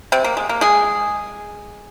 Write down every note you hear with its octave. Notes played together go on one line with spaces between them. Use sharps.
C3 C4
A#3
G#3
A#3
G#3 G#4